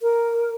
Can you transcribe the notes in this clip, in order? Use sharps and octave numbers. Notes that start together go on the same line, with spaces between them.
A#4